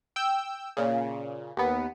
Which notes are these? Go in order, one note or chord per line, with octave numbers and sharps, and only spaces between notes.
G5 E6 G6
A#2 C#3
D#2 B3